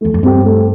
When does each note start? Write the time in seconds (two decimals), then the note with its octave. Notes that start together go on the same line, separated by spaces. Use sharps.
0.01 E2 A3
0.14 F2
0.23 G2 C4 G4
0.45 A3